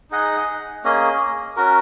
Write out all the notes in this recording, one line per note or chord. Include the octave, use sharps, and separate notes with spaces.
D#4 G#4 D#5 F#5
A#3 C#4 G#4 D#5
C#4 F#4 A#4